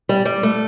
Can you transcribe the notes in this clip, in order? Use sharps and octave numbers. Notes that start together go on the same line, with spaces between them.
G3
G3
A3